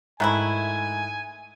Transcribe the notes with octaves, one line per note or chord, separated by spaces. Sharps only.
G#2 D#3 A3 E4 E5 G#5 F#6